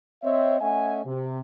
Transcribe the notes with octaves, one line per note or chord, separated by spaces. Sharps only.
C4 C#5 D#5 E5
A3 C#4 D#5 E5 F#5 G#5
C3